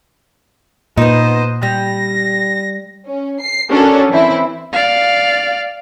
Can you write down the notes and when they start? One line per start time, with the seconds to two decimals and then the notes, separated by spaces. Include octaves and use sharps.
0.97 A#2 B3 D#4 C5 D#5
1.63 G3 A#6
3.06 C#4
3.40 C7
3.70 C#4 D4 F#4 A4 A#4 C#5
4.09 E3 C4 E4
4.72 D5 F5